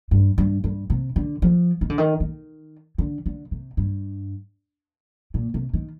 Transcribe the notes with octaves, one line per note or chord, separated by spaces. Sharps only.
G2
G2
G2
C3
D3
F3
D#3
D3
D#3
D#3
D3
D3
C3
G2
A#2
C3
D#3